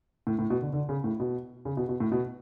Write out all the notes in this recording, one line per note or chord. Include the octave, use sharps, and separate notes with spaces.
A2
A2
B2
D3
D3
C#3
A2
B2
C#3
B2
B2
A2
B2